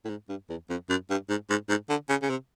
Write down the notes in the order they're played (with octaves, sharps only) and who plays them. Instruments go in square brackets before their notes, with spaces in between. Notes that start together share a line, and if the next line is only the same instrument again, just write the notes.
[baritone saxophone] A2
G#2
G2
E2
F2
F#2
G2
G#2
G#2
G#2
D3
C#3
C#3
C3